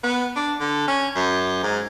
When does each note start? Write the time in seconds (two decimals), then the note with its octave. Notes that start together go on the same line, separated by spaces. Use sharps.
0.03 B3
0.36 D4
0.60 D3
0.87 C#4
1.16 F#2
1.63 G#2